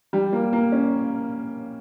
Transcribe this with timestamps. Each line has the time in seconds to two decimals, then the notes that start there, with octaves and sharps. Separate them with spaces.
0.13 G3
0.33 A#3
0.53 A#3
0.72 C#4